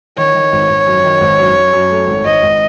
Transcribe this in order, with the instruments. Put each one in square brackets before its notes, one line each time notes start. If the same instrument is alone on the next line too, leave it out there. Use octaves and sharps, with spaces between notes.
[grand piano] D#3 [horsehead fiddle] C#5
[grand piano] D#3
G#1
G#1
F#2
D#3
G#1
F#2
F#2
F#2
A3
G#1
[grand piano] G#1 [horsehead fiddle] D#5
[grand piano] G#1